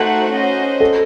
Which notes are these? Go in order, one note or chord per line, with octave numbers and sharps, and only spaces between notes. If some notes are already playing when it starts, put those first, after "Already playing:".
Already playing: A3 D#4 F#4 A4 C5 F#5
C#4 F#4 C5 D#5
A4